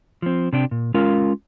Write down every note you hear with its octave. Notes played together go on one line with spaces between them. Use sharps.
F3 C4
C3 D4 G5
A#2
G#3 C#4 F4 A#4 F5